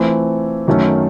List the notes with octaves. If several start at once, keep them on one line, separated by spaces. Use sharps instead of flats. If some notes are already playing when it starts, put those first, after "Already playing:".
Already playing: E3 A3 C4 F4
F#2 D#3 F#3 A3 C#4